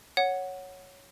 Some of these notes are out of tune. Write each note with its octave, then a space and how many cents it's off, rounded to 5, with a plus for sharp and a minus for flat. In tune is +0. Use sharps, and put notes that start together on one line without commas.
C#5 +0 F#5 +0